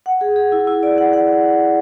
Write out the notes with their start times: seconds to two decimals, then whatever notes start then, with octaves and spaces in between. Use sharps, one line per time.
0.06 F#5
0.21 G#4
0.36 G#4
0.52 E4
0.67 E4
0.83 D5
0.98 F#5
1.13 F#5